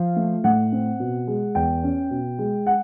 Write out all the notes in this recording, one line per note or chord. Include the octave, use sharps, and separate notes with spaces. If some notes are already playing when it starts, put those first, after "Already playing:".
Already playing: F3 F5
A3
A2 F#5
C4
B2
G#3
E2 G5
C#4
B2
G#3
F#5